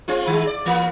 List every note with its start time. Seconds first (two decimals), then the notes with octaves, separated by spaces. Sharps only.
0.08 G#3 C4 F4
0.27 D#3 G#3
0.47 D5
0.66 E3 A#3 B3